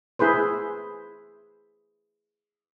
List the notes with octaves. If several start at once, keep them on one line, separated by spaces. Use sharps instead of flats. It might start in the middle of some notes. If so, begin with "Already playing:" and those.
E4 G#4 B4 C5